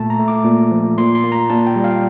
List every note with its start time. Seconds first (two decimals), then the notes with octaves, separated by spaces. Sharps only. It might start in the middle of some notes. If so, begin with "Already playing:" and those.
Already playing: A#2 A3 A5
0.10 A#5
0.19 A3
0.28 D6
0.44 A#2
0.71 F3
0.97 A#2 C6
1.15 C6
1.24 A#3
1.32 A#5
1.50 A#2 A5
1.67 G5
1.76 G3
1.84 F5